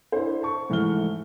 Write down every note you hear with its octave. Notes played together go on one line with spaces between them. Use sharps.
D4 E4 C5
A5 C#6
G#2 E3 A3 A4 F6 G7